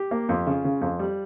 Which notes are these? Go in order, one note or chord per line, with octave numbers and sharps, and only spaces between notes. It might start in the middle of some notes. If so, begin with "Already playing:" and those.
Already playing: G4
A#3
F2
C#3 F4
C#3
F2
G3